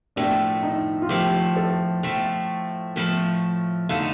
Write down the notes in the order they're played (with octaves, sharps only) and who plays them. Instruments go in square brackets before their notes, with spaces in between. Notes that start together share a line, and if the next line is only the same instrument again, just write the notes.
[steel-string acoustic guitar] A2 F3 A3 [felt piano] D4
[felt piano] D#4
F4
[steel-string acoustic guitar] A2 F3 A3 [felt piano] G4
[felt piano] A4
[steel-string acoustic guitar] A2 F3 A3
A2 F3 A3
[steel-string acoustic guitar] D3 A3 D#4 A4 [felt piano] F5